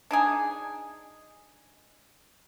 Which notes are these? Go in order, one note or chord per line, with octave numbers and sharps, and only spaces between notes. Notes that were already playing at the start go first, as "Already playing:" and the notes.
D4 D#4 G#4